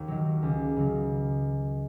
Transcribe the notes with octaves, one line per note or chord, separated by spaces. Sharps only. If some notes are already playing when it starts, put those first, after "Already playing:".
Already playing: D#2
D#3 F#3
C#2
C#3 F#3